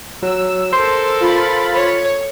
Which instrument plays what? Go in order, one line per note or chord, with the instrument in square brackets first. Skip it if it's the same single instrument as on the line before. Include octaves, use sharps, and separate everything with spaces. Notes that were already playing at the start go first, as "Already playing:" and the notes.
[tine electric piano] F#3 [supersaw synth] E6
[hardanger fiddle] A4 A#4 [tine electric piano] C5 C6
[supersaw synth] F4 B5 A6
[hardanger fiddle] C#5